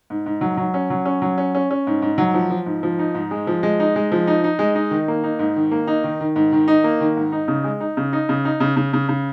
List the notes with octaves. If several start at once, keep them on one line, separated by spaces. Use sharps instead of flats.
G#2
G#2
F#3
F#3
C#4
F#3
C#4
F#3
C#4
C#4
C#4
G#2
G#2
F#3
F3
F3
G#2
F3
D#4
G#2
G#3
F3
G#3
D#4
G#3
F3
D#4
D#4
G#3
D#4
D#3
A#3
D#4
G#2
D#3
A#3
D#4
D#3
D#3
G#2
D#3
D#4
A#3
D#3
G#2
D#4
C#3
G#3
D#4
C#3
D#4
C#3
D#4
C#3
C#3
C#3
C#3